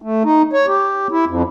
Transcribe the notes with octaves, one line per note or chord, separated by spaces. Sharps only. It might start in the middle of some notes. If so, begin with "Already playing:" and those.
A3
D#4
C#5
G4
E4
F2